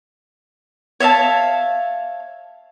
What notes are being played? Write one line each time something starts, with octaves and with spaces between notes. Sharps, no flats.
C#5 E5 F5 A5